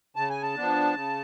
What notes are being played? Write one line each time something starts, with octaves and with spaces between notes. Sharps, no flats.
C#3 A5
G#5
A5
F3 B3 D4
C#3